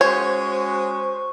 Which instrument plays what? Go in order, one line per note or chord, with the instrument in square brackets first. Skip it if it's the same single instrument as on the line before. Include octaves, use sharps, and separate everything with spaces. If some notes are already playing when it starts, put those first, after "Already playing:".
[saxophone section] G#3 C#4 F#4 [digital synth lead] C5 [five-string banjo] C#5 [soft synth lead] C#6